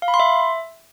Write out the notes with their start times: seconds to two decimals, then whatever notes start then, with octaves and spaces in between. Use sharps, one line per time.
0.02 F5
0.08 B5
0.14 C6
0.20 E5